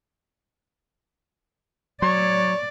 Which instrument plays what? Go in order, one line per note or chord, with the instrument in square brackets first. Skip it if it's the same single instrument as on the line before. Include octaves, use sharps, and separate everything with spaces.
[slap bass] F#3 [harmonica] C#5 C#6 [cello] D5